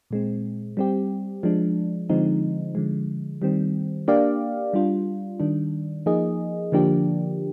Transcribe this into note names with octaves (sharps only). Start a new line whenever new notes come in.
A#2 G#3 C4
G3 C4 G4
F3 G#3 D4
D3 F3 G#3 C4 D#4
D3 F3 G#3
D#3 G3 C4
A#3 D4 G4 D5 F5
G3 D4 F4
D#3 G3 D4
F3 A#3 D#4 G#4 D#5
D3 F3 A#3 D4 G4